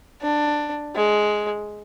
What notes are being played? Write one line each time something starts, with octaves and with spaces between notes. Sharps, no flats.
D4
G#3